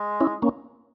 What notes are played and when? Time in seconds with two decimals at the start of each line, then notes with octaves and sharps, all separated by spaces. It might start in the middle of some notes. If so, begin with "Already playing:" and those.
Already playing: G#3
0.21 C#4 E4
0.42 A#3 C#4